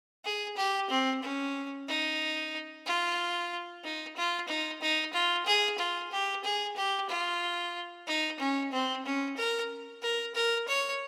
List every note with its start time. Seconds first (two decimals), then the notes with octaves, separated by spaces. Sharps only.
0.25 G#4
0.57 G4
0.90 C4
1.23 C#4
1.88 D#4
2.86 F4
3.84 D#4
4.17 F4
4.48 D#4
4.81 D#4
5.13 F4
5.46 G#4
5.78 F4
6.12 G4
6.44 G#4
6.77 G4
7.10 F4
8.07 D#4
8.40 C#4
8.72 C4
9.05 C#4
9.37 A#4
10.02 A#4
10.35 A#4
10.68 C#5